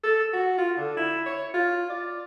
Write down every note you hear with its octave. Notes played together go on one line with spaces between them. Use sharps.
A4
F#4
F4
D3
E4
C#5
F4
D5